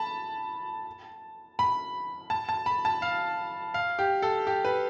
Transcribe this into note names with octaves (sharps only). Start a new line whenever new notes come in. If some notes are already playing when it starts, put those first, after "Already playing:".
Already playing: A5 B5
B5
A5
A5
B5
A5
F5
F5
G4
A4
G4
B4